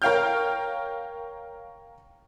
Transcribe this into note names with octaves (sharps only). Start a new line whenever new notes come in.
A#4 C#5 F5 G5 F6 G6